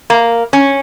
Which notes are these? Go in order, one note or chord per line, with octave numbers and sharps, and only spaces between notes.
A#3
C#4